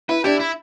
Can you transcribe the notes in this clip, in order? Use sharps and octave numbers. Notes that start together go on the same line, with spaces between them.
E4 B4
D4 E4 G4
E4